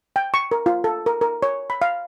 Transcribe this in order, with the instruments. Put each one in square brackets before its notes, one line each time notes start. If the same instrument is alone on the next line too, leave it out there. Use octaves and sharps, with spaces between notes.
[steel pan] G5
C#6
A#4
F4
A4
A#4
A#4
C#5
B5
F5